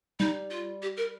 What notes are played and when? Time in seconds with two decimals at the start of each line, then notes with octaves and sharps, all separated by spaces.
0.19 G3 D#4
0.50 F4
0.82 G4
0.97 A#4